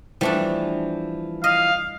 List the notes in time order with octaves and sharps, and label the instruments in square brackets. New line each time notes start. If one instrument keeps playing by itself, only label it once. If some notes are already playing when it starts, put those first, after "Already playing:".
[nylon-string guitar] E3 F3 [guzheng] G3 A3 D4
[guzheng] D#5 [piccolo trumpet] F5